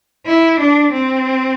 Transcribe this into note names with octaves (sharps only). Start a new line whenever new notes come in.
E4
D4
C4